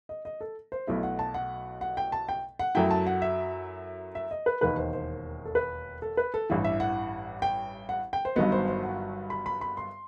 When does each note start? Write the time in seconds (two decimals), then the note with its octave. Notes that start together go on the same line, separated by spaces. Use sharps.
0.09 D#5
0.25 D#5
0.41 A4
0.72 C5
0.87 B1 B2 A3 E4 E5
1.03 F#5
1.19 A5
1.34 F#5
1.81 F#5
1.97 G5
2.12 A5
2.29 G5
2.59 F#5
2.75 F#2 F#3 A3 E4 G5
2.91 A5
3.07 F#5
3.22 E5
4.15 E5
4.31 D#5
4.46 B4
4.61 E1 D#2 D#3 B4
4.78 C5
4.93 C5
5.45 A4
5.55 B4
6.02 A4
6.17 B4
6.34 A4
6.50 A1 G2 E3
6.64 E5
6.80 F#5
7.42 G5
7.89 F#5
8.13 G5
8.25 C5
8.36 G1 G2 D#3 F#3 B3 D#5
8.52 C5
8.68 C5
8.83 F#5
9.30 B5
9.46 B5
9.61 B5
9.77 C6